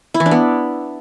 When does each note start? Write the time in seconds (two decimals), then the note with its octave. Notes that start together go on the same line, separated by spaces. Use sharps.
0.14 E4
0.20 E3
0.26 D4
0.31 B3